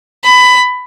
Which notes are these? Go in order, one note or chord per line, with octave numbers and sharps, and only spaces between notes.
B5